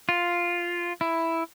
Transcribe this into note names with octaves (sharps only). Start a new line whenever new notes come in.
F4
E4